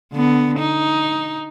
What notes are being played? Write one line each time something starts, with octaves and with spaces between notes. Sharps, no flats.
D3 B3
D#4